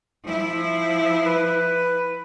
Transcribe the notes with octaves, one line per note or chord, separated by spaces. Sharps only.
F3 E4
B4